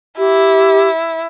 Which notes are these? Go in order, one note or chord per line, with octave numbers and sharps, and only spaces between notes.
E4 G4